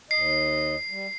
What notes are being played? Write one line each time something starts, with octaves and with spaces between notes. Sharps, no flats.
D#2 D#5 C7
G3